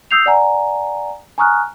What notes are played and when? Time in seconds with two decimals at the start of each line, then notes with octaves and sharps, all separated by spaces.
0.11 D#6 E6 G6 C7 F7
0.26 D5 F#5 G#5 A#5
1.38 G#5 A#5 C#6 D#6 F6 F#6